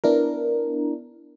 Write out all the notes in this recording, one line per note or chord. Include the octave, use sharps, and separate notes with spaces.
B3 D4 E4 A#4